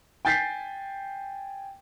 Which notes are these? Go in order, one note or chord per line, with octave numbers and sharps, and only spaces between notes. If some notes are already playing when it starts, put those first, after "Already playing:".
G5 G#5 G6 A6 B6 C7